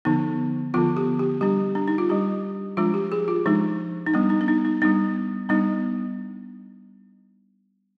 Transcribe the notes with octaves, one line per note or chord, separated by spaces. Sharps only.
D3 F3 B3 D#4
D3 F3 B3 F4
G4
G4
G3 D4 G4
D4
D#4
F4
G3 D4 G4
F3 G#3 D4 F4
G4
G#4
F4
F3 G#3 D4 D#4
D#4
G3 B3 D4
D#4
D4
D#4
D#4
G3 B3 D4 D#4
G3 B3 D4 D#4